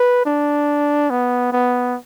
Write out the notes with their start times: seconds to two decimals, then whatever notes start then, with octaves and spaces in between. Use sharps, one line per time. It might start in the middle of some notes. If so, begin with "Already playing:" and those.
Already playing: B4
0.26 D4
1.10 B3
1.52 B3